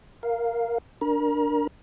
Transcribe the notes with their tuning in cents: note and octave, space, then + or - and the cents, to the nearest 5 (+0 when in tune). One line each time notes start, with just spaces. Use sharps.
A#4 +0 F5 +0
D4 +0 A#4 +0 A#5 +40